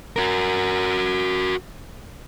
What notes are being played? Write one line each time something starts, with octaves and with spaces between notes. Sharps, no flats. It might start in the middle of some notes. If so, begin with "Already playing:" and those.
F#4 A#4